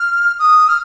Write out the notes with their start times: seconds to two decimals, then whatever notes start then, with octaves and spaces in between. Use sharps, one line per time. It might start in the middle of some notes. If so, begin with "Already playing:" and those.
Already playing: F6
0.39 D#6
0.69 F6